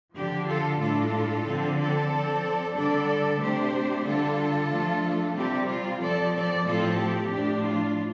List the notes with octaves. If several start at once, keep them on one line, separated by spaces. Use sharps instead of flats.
D3 F3 D4 G4
F4 A4
A2 G3 D4 F4 A4
D3 F3 C4
A4 D5
F3 C4
D3 G3 D4 A4 D5
C3 A3 D4 G4 C5
D3 G3 D4 F4 A4
F3 A3 D4
C3 G3 C4 G4
F4
F3 C4 A4 D5
A4 D5
A2 F3 C4 F4 A4
G4
A2 F3 D4
F4